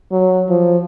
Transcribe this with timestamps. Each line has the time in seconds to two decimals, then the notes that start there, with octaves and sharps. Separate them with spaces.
0.12 F#3
0.49 F3